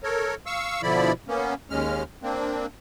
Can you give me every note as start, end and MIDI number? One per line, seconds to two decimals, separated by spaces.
0.03 0.35 69
0.03 0.35 70
0.03 0.35 73
0.46 0.81 77
0.46 0.81 85
0.46 0.81 88
0.83 1.12 47
0.83 1.12 50
0.83 1.12 53
0.83 1.12 64
0.83 1.12 74
0.83 1.12 83
1.28 1.54 58
1.28 1.54 59
1.28 1.54 61
1.70 2.03 39
1.70 2.03 56
1.70 2.03 61
1.70 2.03 89
2.23 2.66 58
2.23 2.66 60
2.23 2.66 62